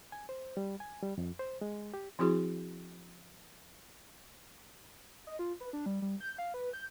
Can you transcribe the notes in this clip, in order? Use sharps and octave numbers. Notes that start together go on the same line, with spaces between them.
G#5
C5
G3
G#5
G3
F2
C5
G#3
G4
F3 C4 E4 F#4 G#4
D#5
F4
B4
D4
G3
G3
G6
F5
B4
G6